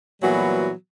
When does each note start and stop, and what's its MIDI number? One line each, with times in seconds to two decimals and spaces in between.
0.22 0.72 46
0.22 0.72 52
0.22 0.72 54
0.22 0.72 55
0.22 0.72 59
0.22 0.72 66